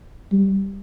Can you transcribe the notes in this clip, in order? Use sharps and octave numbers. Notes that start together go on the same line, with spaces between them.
G3